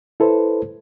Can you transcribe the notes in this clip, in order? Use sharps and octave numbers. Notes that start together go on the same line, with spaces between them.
E4 A4 B4 C5